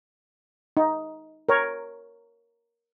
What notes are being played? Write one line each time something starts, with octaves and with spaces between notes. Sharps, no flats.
D#4
A#4 C#5